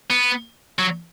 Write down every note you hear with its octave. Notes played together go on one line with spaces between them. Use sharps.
B3
F#3